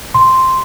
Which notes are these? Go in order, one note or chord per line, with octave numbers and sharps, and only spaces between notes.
C6